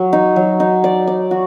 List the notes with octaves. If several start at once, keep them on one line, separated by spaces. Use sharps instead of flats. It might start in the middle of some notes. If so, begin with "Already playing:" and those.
Already playing: F#3
D#4
F#3
D#4
D5
D5
F#4